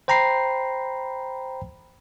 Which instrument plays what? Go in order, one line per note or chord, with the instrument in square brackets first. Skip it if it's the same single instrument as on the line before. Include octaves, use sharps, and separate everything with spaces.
[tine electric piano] C5 G5 A#5 B5 C7